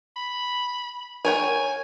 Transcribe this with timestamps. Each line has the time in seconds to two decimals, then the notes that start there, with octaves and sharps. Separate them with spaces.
0.16 B5
1.25 A#4 C#5 G5 G#5